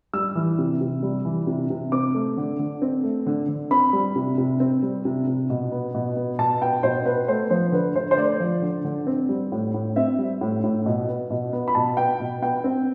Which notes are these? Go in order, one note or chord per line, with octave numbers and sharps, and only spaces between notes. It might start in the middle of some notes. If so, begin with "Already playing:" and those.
G3 E6
E3
C3
C3
G3
E3
C3
C3
C4 D6
A3
D3
D3
C4
A3
D3
D3
C4 B5
G3
C3
C3
C4
G3
C3
C3
B2
B3
B2
B3
B2 A5
B3 G5
B2 C5
B3 B4
A3 C5
F3 C5
D3 B4
D3 C5
C5
A3 D5
F3
D3
D3
C4
G3
A2
A2
C4 E5
G3
A2
A2
B2
B3
B2
B3
B5
B2 A5
B3 G5
B2
B3 G5
C4